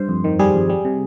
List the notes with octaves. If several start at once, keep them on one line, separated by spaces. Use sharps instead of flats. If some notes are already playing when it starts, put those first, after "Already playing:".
Already playing: G2 C5
F2
D#3
G3 G#4
F2
G3
C3